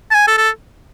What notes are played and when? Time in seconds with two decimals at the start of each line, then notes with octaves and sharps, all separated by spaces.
0.11 A5
0.15 G#5
0.27 A4
0.38 A4